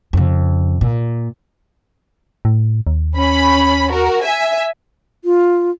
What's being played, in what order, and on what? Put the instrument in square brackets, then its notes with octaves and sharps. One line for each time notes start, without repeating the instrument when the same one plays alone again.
[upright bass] F2 C#3
A#2
[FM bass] A2
D#2
[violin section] C#4 B5
F#4 A#4
E5 G#5
[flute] F4